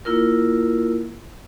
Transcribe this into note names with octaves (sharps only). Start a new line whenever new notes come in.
A#3 E4 F4 A#4